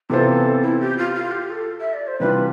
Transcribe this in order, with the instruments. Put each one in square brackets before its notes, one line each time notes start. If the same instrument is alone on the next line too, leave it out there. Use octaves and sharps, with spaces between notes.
[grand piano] C3 E3 B3 F4 C5 [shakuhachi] A4
[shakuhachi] E4
G4
F4
F4
G4
A4
E5
D5
C5
[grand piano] C3 E3 G3 D4 F4 [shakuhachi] B4